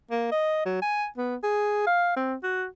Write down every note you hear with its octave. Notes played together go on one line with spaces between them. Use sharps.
A#3
D#5
F#3
G#5
B3
G#4
F5
C4
F#4